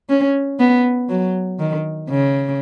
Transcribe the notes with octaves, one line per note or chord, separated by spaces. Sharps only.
C#4
B3
F#3
D#3
C#3